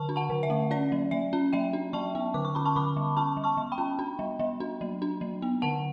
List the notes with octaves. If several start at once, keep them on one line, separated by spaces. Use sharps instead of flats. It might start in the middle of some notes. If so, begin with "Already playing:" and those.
Already playing: D3 A5 C#6
D4
F#5 A5
D3
E5
A3
C#4 D5
F#3
F#3 E5
C#4
F#3 E5 G5
D4
F#3 A5 C#6
B3
D3 D6
C#6
C#4 B5
A5 C#6
D3 B5 D6
G3
C#4 A5 C#6
G3
A5 C#6
G3
G5 B5
C#4
D4
G3
G3
D4
F#3
D4
F#3
B3
D3 F#5 A5